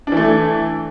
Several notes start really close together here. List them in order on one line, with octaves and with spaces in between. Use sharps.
D4 E3 A3